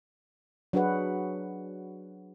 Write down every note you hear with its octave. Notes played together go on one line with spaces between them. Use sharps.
F#3 D4 F#4 G#4 B4 F#5